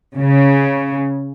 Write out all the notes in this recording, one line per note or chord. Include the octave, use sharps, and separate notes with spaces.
C#3